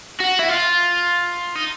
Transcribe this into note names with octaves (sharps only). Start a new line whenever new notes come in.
F#4
E4
F4
D#4